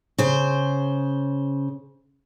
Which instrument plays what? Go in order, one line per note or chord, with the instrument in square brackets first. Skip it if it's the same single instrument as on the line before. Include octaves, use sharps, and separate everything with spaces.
[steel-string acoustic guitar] C#3 C5